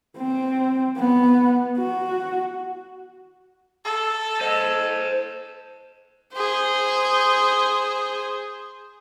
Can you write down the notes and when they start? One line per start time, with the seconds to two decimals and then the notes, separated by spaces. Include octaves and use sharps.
0.17 C4
0.97 B3
1.78 F#4
3.85 A4
4.41 C5 D#5
6.33 G#4 C5